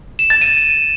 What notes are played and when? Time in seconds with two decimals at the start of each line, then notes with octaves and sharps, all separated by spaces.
0.19 E7
0.30 A6
0.42 D#7